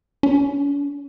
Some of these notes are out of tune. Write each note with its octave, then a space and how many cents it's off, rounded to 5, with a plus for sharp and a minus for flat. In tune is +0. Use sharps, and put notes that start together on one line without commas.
C#4 +45